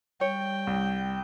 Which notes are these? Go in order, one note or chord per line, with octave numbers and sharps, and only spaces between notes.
G3 C#5 G5
C2